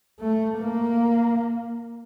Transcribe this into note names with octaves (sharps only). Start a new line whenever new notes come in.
A3
A#3